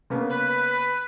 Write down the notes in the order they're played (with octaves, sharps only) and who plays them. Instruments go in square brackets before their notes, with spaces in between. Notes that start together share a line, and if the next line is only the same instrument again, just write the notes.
[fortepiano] C#3 A#3 B3
[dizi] B4